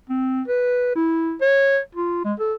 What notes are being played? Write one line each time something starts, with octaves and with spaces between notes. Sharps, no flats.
C4
B4
E4
C#5
F4
G#3
A4